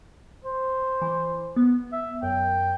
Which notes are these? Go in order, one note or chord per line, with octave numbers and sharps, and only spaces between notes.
C5
E3
B3
E5
F#2 G5